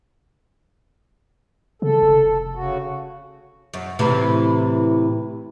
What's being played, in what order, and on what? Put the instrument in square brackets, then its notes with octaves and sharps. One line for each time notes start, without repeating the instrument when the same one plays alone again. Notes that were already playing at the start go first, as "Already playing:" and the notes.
[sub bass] C#3 [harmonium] A4
[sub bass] F1
[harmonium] C#3 F#4
[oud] F#2
A2 C3 E3